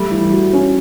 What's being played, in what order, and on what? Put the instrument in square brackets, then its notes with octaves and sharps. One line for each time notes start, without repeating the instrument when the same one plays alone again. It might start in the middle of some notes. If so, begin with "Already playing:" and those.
Already playing: [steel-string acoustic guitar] G3 [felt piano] A3
[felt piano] E3
F#4
C#4